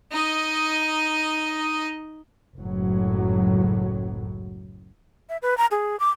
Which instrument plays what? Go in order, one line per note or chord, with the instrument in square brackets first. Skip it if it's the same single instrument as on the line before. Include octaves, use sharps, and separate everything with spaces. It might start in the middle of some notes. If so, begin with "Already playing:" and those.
[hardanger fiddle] D#4 D#5
[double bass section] F#1 C#2 A2 F#3
[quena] E5
B4
A#5
G#4
D6